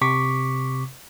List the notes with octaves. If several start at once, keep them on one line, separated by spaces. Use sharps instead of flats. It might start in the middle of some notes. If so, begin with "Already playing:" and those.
C3 C#6 D6 B6